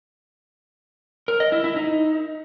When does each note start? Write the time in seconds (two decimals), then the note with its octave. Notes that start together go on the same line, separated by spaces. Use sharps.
1.28 A#4
1.40 D#5
1.52 E4
1.64 E4
1.76 D#4